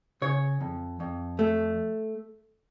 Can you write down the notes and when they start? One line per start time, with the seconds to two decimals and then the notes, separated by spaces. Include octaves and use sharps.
0.22 C#3 C#5
0.61 F2
1.00 F2
1.39 A3